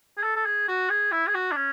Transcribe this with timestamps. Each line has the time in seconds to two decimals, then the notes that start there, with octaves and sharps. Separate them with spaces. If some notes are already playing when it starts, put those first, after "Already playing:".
0.18 G#4
0.23 A4
0.36 A4
0.46 G#4
0.68 F#4
0.90 G#4
1.12 E4
1.27 G#4
1.35 F#4
1.52 D4
1.56 C#4